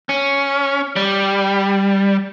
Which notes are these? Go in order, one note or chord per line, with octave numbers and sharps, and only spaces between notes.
C#4
G3